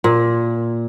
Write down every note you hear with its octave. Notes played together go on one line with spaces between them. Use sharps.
A#2